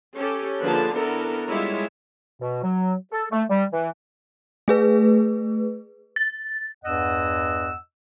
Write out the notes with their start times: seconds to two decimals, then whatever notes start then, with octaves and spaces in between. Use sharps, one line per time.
0.15 C#4 G4 A4
0.60 D3 F3 A#3 G#4 B4 A5
0.93 B3 D4 E4 A4 A#4
1.48 G3 G#3 E4 F4 C#5 E5
2.40 B2
2.63 F#3
3.12 A4
3.32 A3
3.49 G3
3.73 E3
4.68 A3 G#4 B4
6.16 A6
6.84 E2 G2 D#5 F#5 E6